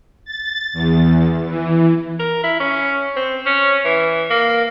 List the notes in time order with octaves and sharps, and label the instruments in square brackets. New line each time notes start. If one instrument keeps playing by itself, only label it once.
[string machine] A6
E2
E3
[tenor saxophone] A#4
E4
C#4
C4
C#4
E3
A#3